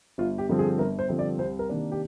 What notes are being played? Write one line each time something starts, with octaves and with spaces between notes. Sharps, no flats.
G1 F4
G4
G2 D3 F3 C4
G#4
G1 A#4
C5
G2 D3 F3 C4
D5
C2 C5
A#4
C3 D#3 A#3 D4
G4